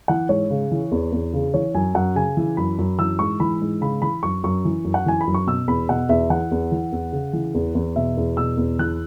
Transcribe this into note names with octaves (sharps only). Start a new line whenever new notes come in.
E3 F#5
G#2 C#5
C#3
E3
E2
E2
C#3
E3 C#5
F#2 G#5
F#2 F#5
C#3 G#5
E3
F#2 B5
F#2
E3 E6
G#2 C#6
E3 B5
G#2
C#3 B5
E3 B5
F#2 C#6
F#2 C#6
E3
F#2
F#5
E3 G#5
B5
F#2
C#6
B2 E6
E2 B5
B2 F#5
E2 E5
E3 F#5
E2
E3
E2
C#3
E3
E2
E2
B2 E5
E2
B2 E6
E2
E3 F#6